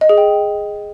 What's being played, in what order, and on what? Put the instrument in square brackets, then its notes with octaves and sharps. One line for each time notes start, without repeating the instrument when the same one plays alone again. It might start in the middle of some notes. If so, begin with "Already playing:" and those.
[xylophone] D#5
G#4
G5